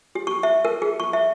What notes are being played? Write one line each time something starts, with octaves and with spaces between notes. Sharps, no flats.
G4
C#6
E5
A#4
G#4
C#6
E5